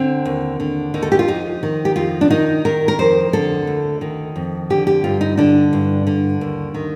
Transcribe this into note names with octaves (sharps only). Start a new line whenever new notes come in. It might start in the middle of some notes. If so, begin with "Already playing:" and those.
Already playing: D3 C4
D#2
D3
D#2 D#4
A4
G4
F4
F2 D#4
D#3
G4
F2 F4
D4
D#3 D#4
D#3 A#4
A#4
F2 C5
D3 A4
D2
D#3
F2
D3 G4
G4
G2 F4
D#4
D3 D4
G2
D3
D#2
D#3